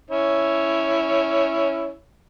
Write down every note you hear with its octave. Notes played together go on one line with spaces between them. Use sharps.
C#4 E4 C#5